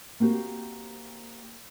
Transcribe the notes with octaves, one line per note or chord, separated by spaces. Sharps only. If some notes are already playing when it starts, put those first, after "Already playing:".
A#3 C4 F#4 G4